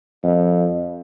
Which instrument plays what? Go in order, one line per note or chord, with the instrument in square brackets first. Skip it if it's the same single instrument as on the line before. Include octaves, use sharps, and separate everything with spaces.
[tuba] F2